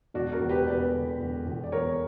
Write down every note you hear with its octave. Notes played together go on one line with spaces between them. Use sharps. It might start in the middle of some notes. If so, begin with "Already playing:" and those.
E1 D4 F#4
F#4 A#4
E1
G4 B4
E2 B4 D5
D3
E1
E1
D5
E2 A#4 C#5